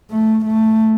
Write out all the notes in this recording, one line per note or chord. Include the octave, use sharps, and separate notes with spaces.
A3
A3